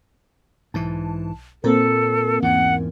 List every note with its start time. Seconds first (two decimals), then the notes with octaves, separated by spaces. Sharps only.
0.74 B1 G#2 E3 A5
1.64 A#2 A#3 C4 A4 A#4
2.42 E2 G#2 F#5